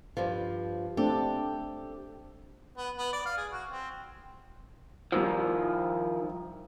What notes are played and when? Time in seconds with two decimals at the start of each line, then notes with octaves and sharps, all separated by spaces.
0.17 G2 F3
0.97 A3 C4 D4 G4 A4
2.77 B3
2.98 B3
3.13 D5
3.26 F5
3.37 G#4
3.52 F#4
3.70 C4
5.12 D#3 F3 G3 E6